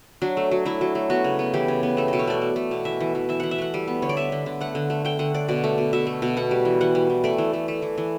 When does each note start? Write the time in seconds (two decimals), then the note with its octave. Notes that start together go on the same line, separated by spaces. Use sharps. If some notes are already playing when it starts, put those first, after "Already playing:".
0.22 F#3 D4
0.37 A3
0.51 F#3
0.65 A3 E4
0.81 F#3
0.95 A3
1.10 B3 F#4
1.24 C#3
1.39 B3
1.54 E3 G4
1.68 C#3
1.83 B3
1.97 A3 A4
2.08 B2 A4
2.19 C#5
2.27 A3 D5
2.42 A3
2.56 A3
2.71 B2
2.85 E3 E5
3.00 E3
3.15 E3
3.29 E3 E5
3.40 E3 F#5
3.51 E5
3.58 A3 F#5
3.74 G3
3.88 B3
4.02 D3 C#5
4.09 D5
4.17 B3 E5
4.32 D3
4.46 D3
4.61 A3 F#5
4.75 D3
4.90 A3
5.05 A3 G5
5.19 D3 F#5
5.34 D3 D5
5.48 B2 D5
5.64 A3
5.78 B2
5.93 B2 E5
6.07 A3
6.22 B2
6.36 B3 F#5
6.51 G3
6.65 E3
6.81 E3 F#5
6.95 G3
7.10 E3
7.24 A3 D5
7.38 E3
7.53 A3
7.68 A3
7.82 E3
7.98 E3